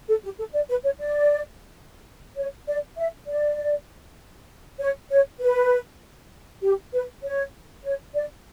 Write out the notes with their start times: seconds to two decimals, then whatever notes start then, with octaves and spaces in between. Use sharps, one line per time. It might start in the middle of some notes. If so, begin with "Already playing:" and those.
0.08 A4
0.23 G4
0.38 A4
0.54 D5
0.69 B4
0.84 C#5
0.99 D5
2.36 C#5
2.67 D5
2.98 E5
3.27 D5
4.80 C#5
5.10 C#5
5.41 B4
6.62 G4
6.93 B4
7.23 C#5
7.84 C#5
8.15 D5